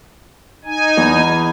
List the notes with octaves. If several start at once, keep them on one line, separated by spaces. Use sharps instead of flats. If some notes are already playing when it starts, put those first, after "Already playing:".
D#4 G#5
E2